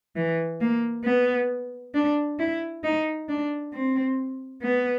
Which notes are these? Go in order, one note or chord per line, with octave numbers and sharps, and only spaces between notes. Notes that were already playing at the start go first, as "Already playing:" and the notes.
E3
A#3
B3
D4
E4
D#4
D4
C4
B3